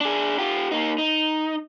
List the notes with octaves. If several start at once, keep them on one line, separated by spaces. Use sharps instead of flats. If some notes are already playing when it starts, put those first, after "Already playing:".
D4 G#4
F4 G4
A#3 D#4
D#4